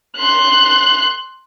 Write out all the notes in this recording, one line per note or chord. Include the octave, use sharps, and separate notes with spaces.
C6 F#6